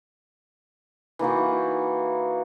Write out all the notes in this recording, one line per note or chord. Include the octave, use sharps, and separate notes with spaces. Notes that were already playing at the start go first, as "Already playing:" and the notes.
E3 A#3 D#4 F#4